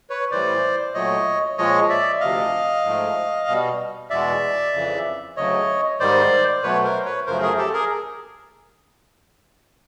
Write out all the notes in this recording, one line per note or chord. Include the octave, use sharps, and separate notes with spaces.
B4 C#5
A2 E3 G3 C5 D5
A#2 F#3 A3 C#5 D#5
A#2 F3 G#3 C#5 D#5
D5 E5
D2 C3 F3 D#5 F5
G#2 F3 A3
B2 G3
E2 B2 G#3 D5 E5
F2 C#3 E3
D2 C#3 F#3 A3 C#5 D#5
G#2 D#3 G3 C5 D5
B2 F#3 A3 B4 C#5
A#4 C5
B4 C#5
F#2 C#3 F3 A3 A#4 C5
G#4 A#4
G4 A4
G#4 A#4